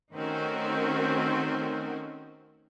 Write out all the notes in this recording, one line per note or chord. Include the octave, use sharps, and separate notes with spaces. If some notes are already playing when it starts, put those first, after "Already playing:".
D#3 A3 C4 C#4 F#4 A#4